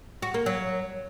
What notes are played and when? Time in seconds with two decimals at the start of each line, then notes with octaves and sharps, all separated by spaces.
0.22 F#4
0.34 A#3
0.46 F#3